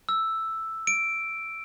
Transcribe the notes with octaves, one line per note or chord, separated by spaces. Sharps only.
E6
D7